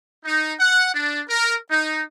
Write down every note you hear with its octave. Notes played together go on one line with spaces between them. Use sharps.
D#4
F#5
D4
A#4
D#4